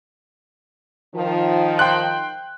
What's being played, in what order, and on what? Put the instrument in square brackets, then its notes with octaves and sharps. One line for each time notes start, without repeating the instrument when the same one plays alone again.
[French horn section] D#3 F3
[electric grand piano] G5 C6 F#6